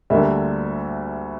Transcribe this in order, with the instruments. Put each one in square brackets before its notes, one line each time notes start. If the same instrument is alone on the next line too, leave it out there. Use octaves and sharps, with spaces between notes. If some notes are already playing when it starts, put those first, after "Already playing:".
[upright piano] D2 D3 G3 A#3 E5